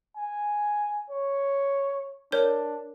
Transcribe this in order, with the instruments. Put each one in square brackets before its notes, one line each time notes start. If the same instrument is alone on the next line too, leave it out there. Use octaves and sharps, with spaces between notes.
[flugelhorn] G#5
C#5
[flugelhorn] D4 [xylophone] A#4 C#5 G6